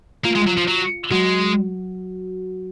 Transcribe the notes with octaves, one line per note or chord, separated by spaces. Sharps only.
A#3 F4
G#3
F#3
F3
F#3
F#3 G#3 F#4